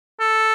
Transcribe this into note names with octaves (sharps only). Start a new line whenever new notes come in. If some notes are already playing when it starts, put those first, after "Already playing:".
A4